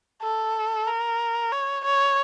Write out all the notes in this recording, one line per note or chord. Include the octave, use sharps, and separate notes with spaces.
A4
A#4
C#5
C#5